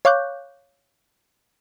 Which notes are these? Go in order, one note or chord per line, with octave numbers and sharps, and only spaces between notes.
C#5 F5 C#6 D6 F#6 G6